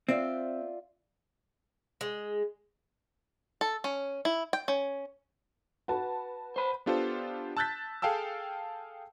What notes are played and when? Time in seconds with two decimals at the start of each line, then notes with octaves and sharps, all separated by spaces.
0.09 C4 F4 D5 E5
2.01 G#3
3.61 A4
3.84 C#4
4.25 E4
4.53 G5
4.68 C#4
5.88 F#4 B4 A5
6.56 C5 B5
6.86 B3 D4 F4 G4 A4 C5
7.57 A5 E6 F#6 G6 A6 B6
8.02 G#4 A4 F5 G5 A5 E6